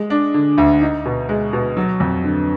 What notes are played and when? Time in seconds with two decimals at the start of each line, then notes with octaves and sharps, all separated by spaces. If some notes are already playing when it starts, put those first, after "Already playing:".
Already playing: G#3
0.10 D4
0.34 D3
0.58 D2
0.81 D#4
1.05 B2
1.29 G#3
1.53 B2
1.77 F#3
2.00 F2
2.24 D3